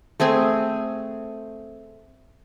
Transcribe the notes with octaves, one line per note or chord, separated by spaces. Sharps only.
A3 C4 G#4 G#5